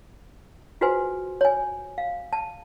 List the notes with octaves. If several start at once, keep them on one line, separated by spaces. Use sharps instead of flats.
F4 F#4 G#4 B4 C5 G#5
C#5 G#5
F5
A5